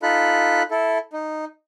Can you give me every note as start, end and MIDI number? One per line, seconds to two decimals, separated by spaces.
0.03 0.63 63
0.03 0.63 65
0.03 0.63 69
0.03 0.63 83
0.03 0.63 90
0.71 0.98 64
0.71 0.98 69
1.13 1.45 63